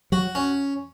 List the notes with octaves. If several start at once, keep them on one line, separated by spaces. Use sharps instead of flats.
F#3 F#4
C#4